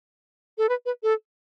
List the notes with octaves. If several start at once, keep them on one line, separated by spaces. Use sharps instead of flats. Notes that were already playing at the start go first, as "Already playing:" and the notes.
A4
B4
B4
A4